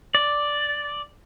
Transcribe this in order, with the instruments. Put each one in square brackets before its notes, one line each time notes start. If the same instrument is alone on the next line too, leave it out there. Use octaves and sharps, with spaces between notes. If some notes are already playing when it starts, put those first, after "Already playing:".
[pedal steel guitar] D5